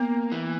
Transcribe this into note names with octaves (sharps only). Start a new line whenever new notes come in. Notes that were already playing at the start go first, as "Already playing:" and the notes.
Already playing: A#3 B3
E3